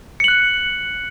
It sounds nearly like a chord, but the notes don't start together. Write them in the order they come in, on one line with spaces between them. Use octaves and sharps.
C#7 F#7 F#6